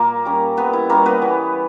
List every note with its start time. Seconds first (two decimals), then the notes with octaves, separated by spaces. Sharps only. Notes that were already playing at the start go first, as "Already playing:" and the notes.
Already playing: A#2 A#3 A#4
0.25 G3 C#4
0.57 A#2 B3 B4
0.73 E4
0.89 G3 A#3 C#4 A#4
1.06 B3 B4
1.22 E3